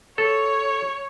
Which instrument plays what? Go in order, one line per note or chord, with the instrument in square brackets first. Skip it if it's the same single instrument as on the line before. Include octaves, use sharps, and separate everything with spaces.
[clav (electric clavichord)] A4 [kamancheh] C#5